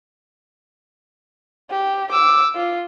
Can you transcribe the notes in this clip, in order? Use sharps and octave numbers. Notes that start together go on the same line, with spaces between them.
G4
D6 E6
F4